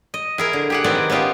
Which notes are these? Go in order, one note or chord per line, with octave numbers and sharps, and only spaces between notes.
D#5
E4 G#4 A#4
D3
G4 G#4 F#5
D#3 B3 C4 D#4 E4 D5
B3 C#4 D#4 F4 G4